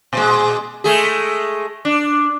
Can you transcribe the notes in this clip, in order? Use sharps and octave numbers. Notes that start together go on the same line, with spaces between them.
A#2 G#3
G#3 A3 G#4
D4